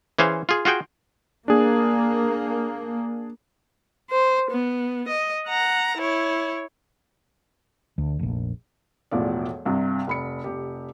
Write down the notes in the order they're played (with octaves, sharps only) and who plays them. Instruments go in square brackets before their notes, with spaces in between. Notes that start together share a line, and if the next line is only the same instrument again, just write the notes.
[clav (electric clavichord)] E3 C#4 G#4 C5 F5
F4 G#4
F4 F#4 G#4 G5
[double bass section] A#3 [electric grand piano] D4 G#4
[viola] C5
B3
D#5
F#5 A#5
E4 C#5
[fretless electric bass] D2
F1 A#1
[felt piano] E1 E2 A2 F3 D5
C2 G2 C3
F1 B5 C#7
F1 G4